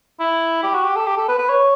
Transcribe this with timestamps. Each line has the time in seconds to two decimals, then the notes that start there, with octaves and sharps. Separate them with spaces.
0.20 E4
0.63 G4
0.74 F#4
0.84 G4
0.96 A4
1.06 G4
1.17 A4
1.28 B4
1.38 B4
1.49 C#5